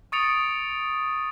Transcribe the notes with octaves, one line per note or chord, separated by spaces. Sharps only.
C#6 D#6 A6 C#7 D7 F7